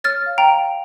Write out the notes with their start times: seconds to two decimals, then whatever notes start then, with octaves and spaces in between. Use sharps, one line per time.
0.04 C#5 F6 A6
0.26 F5
0.38 G5 A#5
0.49 F5